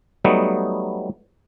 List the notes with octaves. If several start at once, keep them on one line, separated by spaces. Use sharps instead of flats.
F#3 G3 A3 B3 D#4